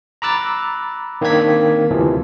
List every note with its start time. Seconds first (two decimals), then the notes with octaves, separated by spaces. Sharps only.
0.22 A#5 B5 D6 E6 F#6 A6
1.21 D#3 A#3 C4 D4 G#6 B6
1.91 D2 C3 E3 F3